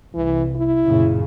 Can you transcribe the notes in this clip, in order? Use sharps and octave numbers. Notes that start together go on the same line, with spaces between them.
C2 E3
E4
F#2 A#2 C#3